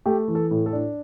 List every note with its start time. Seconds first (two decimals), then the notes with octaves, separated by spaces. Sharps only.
0.06 A3 G4
0.28 E3
0.35 A4
0.51 A2
0.66 A4
0.73 D4